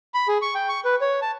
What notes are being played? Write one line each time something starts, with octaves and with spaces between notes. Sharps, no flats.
B5
G#4
C#6
G5
C#6
B4
C#5
A5